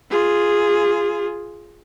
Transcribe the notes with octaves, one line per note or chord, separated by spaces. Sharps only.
F4 G#4